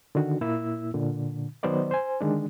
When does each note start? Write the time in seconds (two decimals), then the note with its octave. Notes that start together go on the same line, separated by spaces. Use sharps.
0.15 D3 D#3 F#4
0.41 A#2 A#3 E4 E6
0.94 A#2 D3
1.63 D#3 F#3 B3 C5 D5 D#5
1.91 C5 G#5
2.21 D3 D#3 G#3 D4